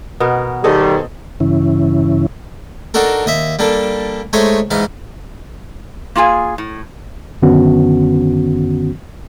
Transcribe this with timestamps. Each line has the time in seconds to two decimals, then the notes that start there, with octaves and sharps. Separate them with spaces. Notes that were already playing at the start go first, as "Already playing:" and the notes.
0.20 B2 B3 A#4
0.64 D#3 G3 G#4 A4 C5 D#5
1.40 G2 C#3 E3 C#4 E4
2.94 D4 D#4 F#4 A4 A#4
3.26 D#2 D#5 E5
3.59 G3 A#3 D4 A4
4.33 G#3 A3 D#4 C5 C#5 D#5
4.71 G#2 E3 D#4 F5
6.15 A#3 F4 G#4 G5 G#5
6.58 A2
7.42 F#2 D3 D#3 B3 C#4 F#4